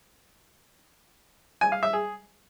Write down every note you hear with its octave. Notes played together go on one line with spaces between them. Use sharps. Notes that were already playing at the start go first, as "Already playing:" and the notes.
G#5
F5
E5
G#4